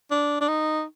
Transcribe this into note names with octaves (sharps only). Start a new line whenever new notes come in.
D4
D4
D#4